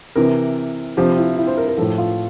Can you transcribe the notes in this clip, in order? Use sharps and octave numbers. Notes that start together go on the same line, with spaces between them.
C3 E3 A#4
C3 F3 G4
E4
E4
C5
A#4
A#4
A2 F3 A4
F4